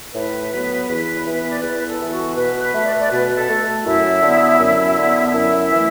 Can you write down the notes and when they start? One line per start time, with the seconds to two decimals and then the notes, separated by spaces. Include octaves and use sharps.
0.13 A2 B4
0.51 F#3 B3
0.88 E2
1.25 E3 B3
1.51 D5
1.62 E2 B4
1.80 B4
1.86 A4
2.00 E3 B3
2.11 F#4
2.36 B2 B4
2.61 B4
2.74 A3
2.85 D5
2.93 B4
3.00 D5
3.10 B2 B4
3.35 A4
3.48 A3
3.84 F#2 E4
4.21 D3 B3
4.58 F#2
4.96 D3 B3
5.27 D4
5.33 F#2 E4
5.70 E3 A3